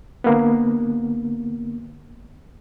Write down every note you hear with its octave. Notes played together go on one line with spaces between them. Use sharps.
D3 A#3 B3